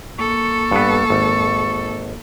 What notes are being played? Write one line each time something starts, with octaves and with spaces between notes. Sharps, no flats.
A#3 A4 C#6
G2 B3
G#1